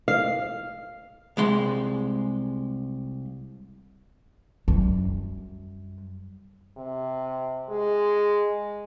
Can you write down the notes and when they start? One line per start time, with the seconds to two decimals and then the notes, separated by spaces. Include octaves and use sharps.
0.08 F5
1.37 C2 G#3 C6
4.68 F#2 G3
6.77 C3
7.69 G#3